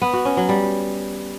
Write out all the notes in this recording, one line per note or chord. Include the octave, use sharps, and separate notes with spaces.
B3
F#4
C#4
F#3
G3